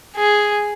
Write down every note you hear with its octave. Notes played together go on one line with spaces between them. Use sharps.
G#4